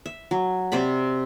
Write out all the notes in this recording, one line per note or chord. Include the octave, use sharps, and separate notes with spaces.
E5
F#3
C3 C5 D5 B5